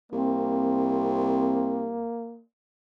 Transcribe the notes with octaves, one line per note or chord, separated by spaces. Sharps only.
C2 A#3 C4